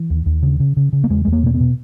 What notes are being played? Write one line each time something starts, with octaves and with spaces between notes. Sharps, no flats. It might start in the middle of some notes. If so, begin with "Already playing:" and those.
Already playing: E3
D#2
D#2
C#3
C#3
C#3
C#3
A#3
E2 G#3
E2 G#3
A#3
B2 A#3
B3
B2